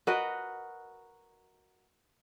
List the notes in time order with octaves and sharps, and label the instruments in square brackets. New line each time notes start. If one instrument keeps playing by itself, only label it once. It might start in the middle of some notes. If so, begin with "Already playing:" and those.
[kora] F#4 A#4 B4 D#5